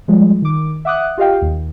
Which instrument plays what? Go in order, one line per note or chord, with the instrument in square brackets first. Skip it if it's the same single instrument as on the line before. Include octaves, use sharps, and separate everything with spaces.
[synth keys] F3 G3 G#3
D#3 D6
E5 F#5 D6 D#6 F#6
F4 G4 D#5 F5 G5
D#2